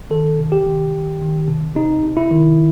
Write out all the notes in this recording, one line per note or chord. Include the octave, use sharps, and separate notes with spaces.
D#3 A4
C3
G4
D#3
D#3
D#3
C3
C3 D#4
C3
E4
D#3